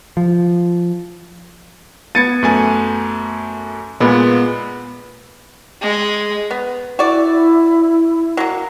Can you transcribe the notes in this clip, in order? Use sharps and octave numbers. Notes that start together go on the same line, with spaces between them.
F3
B3 G#6 A6 C#7 D#7
F#2 A3 G#5
A#2 G#3 B3
G#3
B3
E4 F#4 D5
F#3 A#3